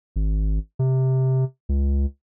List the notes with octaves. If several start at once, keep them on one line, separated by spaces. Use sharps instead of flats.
G#1
C3
C#2